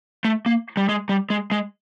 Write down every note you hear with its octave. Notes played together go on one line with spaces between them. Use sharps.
A3
A#3
G3
G#3
G3
G#3
G#3